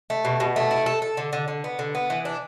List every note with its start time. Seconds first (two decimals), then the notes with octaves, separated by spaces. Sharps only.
0.10 A3
0.25 B2
0.40 B2
0.56 A3
0.71 E4
0.86 A4
1.02 A4
1.17 D3
1.33 D3
1.48 D3
1.64 B3
1.79 D3
1.95 B3
2.10 E3
2.25 D4